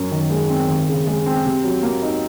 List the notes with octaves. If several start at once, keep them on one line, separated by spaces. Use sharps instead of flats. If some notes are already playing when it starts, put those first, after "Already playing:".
Already playing: F#2
D#3
G#3
C4
D#2
C#3
G#3
C4
C3
F#3
A#3
D#4